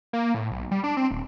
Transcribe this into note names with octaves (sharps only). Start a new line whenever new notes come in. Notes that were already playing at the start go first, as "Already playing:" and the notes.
A#3
A2
B1
G3
D4
C4
D#1